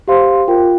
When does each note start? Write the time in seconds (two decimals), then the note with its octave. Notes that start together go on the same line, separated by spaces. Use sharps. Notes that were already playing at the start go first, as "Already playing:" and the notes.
0.08 G4 C5 F5 C6
0.48 F4 A#4 G5